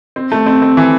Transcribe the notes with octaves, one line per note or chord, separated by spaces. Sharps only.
C4
A3
C4
C4
E3